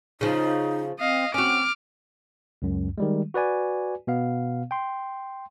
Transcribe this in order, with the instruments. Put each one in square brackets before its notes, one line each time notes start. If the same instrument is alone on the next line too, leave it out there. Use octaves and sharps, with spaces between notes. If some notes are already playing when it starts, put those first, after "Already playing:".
[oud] C#3 F3 [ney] D#4
[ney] C4 [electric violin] D#5 F5
[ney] C4 [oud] C#4 F#4 [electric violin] D6 F6
[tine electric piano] C#2 F#2
D#3 G3 G#3
F#4 B4 D5 G#5
B2 B3 F5
G5 C6